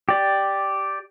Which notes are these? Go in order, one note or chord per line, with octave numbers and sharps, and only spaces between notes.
G4 D5